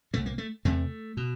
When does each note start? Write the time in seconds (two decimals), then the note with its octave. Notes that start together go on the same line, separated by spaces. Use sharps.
0.14 C2 A#2 A3
0.26 A#3
0.38 A3
0.65 E2 C3 A3
1.17 B2